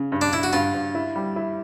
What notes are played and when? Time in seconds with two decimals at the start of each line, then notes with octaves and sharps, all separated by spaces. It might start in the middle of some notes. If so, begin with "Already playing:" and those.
Already playing: C#3
0.12 G2
0.21 D4
0.32 G2 E4
0.43 F#4
0.53 G2 F4
0.74 G2
0.95 E4
1.16 G3
1.36 E4